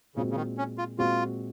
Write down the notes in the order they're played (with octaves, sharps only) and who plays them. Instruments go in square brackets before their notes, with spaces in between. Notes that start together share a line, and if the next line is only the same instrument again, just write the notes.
[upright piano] A#2 G#3 C4 F#4 [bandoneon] C#3
[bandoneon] C#3
D#3
C#4
F4
[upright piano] A#2 G#3 C4 F#4 [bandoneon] F4